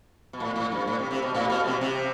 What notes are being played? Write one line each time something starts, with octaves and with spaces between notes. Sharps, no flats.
B2
A2
A2
G2
A2
C3
C3
B2
A2
B2
C3
C3